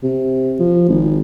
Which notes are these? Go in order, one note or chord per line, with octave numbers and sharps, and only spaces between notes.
C3
F3
G#1